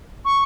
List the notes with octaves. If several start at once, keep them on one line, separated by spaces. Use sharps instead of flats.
C#6